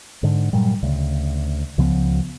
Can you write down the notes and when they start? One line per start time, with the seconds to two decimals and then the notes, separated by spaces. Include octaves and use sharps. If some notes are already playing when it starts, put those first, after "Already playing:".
0.23 G#2 D3
0.53 G2 A#2 F#3 G3
0.83 D2 C#3
1.78 C#2 C#3 F3 B3